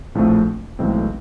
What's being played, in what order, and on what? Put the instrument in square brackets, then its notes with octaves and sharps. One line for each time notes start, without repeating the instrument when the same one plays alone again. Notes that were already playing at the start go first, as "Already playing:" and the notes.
[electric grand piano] A#1 A2 F3 A3 C4
B1 A2 E3 G#3 C4